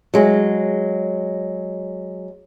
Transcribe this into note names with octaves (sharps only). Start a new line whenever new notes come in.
F#3 G#3